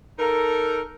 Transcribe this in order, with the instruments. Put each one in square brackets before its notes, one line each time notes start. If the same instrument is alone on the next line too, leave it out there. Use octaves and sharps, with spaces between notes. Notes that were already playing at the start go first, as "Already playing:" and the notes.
[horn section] D#4 A4 A#4